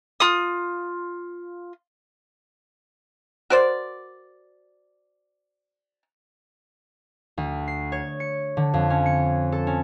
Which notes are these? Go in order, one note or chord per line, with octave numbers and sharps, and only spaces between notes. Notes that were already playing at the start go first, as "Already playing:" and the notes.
F4 D#6
F#4 A#4 C5 D5
D2
C7
C#5
C#7
D3
F2
C#4
C#7
A4
C#4